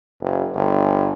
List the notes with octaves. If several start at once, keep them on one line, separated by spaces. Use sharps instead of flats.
F#1
G1